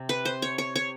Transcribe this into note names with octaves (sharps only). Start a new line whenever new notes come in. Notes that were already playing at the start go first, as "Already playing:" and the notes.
Already playing: C3
B4
C5
C#5
C#5
C#5